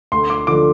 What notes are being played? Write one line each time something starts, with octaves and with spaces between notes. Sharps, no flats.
D2 C6
D6
D3 F3 D6